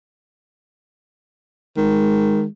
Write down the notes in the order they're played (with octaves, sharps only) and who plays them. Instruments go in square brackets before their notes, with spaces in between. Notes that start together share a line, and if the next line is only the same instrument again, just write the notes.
[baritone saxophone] D#3 [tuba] G#3